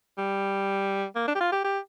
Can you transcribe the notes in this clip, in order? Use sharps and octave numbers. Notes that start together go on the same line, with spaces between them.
G3
A#3
D4
G4
F4
G4
G4